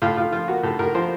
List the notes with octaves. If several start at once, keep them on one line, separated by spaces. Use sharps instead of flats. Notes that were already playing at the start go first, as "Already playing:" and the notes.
A2 F4
A2 F4
F3 F4
A#3 F#4
A2 A4
A2 A#4
F3 C5